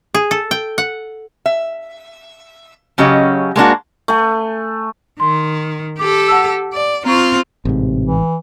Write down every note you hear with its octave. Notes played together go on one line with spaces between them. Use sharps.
G#4
A4
G5
F#5
E5
C#3 F#3 C#4 G4 D#5
G#3 A#3 D4 F#4
A3 G#5
D#3 C6
G4 A4 D6
F#5 A5 E6
D5
C4 F4 A#5 C#6
A1 G#2 C3
E3